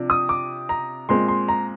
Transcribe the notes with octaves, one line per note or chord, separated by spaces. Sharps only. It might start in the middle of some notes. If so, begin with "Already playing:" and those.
Already playing: C3 F3 D4
D#6
D6
A#5
A#2 G#3 C4 C6
C6
A#5